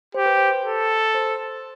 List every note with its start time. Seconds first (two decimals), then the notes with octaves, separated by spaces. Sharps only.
0.14 G4 C5
0.26 B4
0.37 C5
0.65 A4
1.15 C5